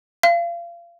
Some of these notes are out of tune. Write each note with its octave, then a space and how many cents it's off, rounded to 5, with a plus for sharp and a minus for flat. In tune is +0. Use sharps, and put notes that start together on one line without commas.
F5 -30